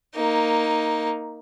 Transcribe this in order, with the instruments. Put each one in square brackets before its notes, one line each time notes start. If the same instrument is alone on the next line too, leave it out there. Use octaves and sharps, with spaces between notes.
[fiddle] A#3 D#4